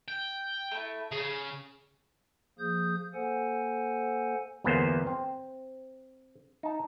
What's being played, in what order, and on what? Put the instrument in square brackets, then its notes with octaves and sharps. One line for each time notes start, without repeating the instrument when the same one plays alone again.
[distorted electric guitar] G5
[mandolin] A3 E4
[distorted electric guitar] C#3 [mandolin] G#4 C#5
[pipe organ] F3 A#3 G#4 D#6 G6
A#3 A4 C5 F#5 G#5
[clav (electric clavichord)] G1 E2 A#3 B3 G#4 C5
C4
D#4 A5